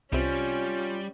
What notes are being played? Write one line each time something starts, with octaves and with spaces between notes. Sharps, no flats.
C2 C3 G3 C#4 F4